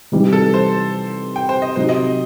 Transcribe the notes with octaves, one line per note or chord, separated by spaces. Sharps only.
C3 E3 G3 D#4
A4
C5
G5
C5
D#5
C3 F#3 C4 D#4 G4 C5
D#5